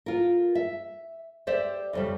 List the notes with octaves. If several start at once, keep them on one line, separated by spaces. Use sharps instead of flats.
F4 A#4
E5
G4 C5 D5 E5
F2 C#3 G3